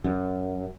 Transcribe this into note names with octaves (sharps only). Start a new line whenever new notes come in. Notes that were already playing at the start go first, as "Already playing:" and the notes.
F#2